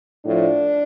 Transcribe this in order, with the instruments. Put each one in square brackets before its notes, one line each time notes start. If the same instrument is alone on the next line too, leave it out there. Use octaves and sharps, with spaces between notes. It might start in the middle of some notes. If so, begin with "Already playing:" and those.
[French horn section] A2 F3 D4